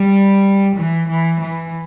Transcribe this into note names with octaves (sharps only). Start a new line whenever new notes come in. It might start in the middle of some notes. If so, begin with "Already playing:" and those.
Already playing: G3
E3
E3
E3